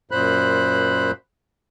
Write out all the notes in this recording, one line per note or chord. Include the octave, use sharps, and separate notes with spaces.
F#2 A#2 C5 B5 F#6